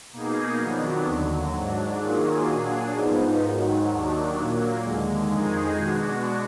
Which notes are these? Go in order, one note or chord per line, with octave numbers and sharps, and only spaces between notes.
B2 A#3 D#4 G#4
F2 D#3 F#3 B3 D4
D#2 D3 F#3
G#2 F#3 D4
D#3 F#3 A#3 F4 G#4
A#2 F#3 D4 G#4
G#2 F3 B3 D#4
G#2 D#3 F#3
D#2 D#3 F#3 D4
A#2 F#3 A#3
D#2 D3 G#3
F2 D#3 G#3 D#4 G#4
B2 G#3 D4 F#4